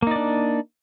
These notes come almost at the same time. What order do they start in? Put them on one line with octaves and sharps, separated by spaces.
A#3 D#4 D5 D4